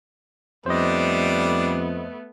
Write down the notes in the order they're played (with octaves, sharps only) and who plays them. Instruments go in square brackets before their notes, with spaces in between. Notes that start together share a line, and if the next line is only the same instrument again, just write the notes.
[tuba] F2 [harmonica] G3 D4 [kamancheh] A3 B3 [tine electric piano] C5 D#5